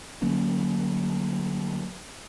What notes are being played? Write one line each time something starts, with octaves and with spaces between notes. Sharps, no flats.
D3 F#3 A#3 C#4